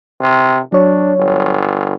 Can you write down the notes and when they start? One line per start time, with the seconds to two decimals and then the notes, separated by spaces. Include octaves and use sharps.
0.21 C3
0.72 F#3 D4 C#5
1.18 G1